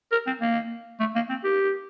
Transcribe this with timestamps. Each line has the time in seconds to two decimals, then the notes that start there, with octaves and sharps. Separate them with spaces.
0.12 A#4
0.27 C4
0.41 A#3
1.00 A3
1.15 A#3
1.29 C4
1.44 G4